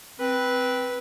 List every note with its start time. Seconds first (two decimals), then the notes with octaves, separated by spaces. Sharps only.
0.20 C4 B4